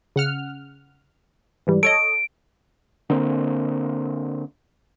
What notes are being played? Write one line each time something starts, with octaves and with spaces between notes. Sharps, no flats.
C#3 F#5 F6
G#2 E3 G3
A4 C#5 D#5 D7
D3 A#3 C4